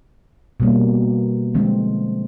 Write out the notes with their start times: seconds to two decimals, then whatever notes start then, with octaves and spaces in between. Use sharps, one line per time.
0.60 B2 G3 A#3
1.55 D3 F3 G#3 C4